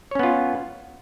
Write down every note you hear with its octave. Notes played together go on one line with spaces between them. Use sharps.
B3 C#4 F4 C#5